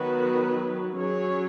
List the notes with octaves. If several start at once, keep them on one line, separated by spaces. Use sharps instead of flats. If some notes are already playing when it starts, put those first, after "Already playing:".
Already playing: D#3 F#3 B3 F#4 B4
F#3 C#4 G#4 C#5